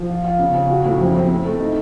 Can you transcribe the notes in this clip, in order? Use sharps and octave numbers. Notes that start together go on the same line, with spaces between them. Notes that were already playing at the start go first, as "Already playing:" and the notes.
Already playing: F3
F4
F4
C#3
C#3
F#4
A2
F2
C4
A3
A3
D#4